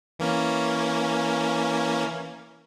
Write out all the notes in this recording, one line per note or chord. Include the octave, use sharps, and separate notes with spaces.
E3 A#3 C#4